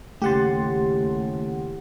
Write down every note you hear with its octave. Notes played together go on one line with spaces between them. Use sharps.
D#2 A2 C#3 A3 G4 F#5 C6 A6